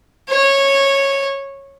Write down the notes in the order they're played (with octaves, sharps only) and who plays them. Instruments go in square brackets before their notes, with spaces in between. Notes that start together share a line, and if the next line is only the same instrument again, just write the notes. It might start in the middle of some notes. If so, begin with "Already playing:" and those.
[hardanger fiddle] C#5